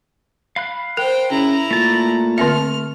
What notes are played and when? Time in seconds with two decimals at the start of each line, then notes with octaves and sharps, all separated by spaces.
0.56 F5 B5 F#6
0.97 A#4 C5 G5
1.31 C#3 E4 A#5
1.71 A#2 A3 A5
2.38 D3 C4 E5 F6